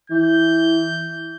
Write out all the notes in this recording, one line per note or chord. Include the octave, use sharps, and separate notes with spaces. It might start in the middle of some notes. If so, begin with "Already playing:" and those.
E3 G6